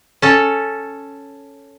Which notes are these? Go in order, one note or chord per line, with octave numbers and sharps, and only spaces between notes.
C#4 A4